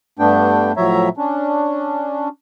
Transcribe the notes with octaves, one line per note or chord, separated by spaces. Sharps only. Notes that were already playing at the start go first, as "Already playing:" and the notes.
G2 A3 B3 D4 G5
A2 F3 F#3 C#5 E5 A#5
C#4 D4